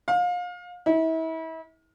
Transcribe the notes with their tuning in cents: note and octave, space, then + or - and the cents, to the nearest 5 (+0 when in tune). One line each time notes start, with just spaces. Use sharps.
F5 +30
E4 -35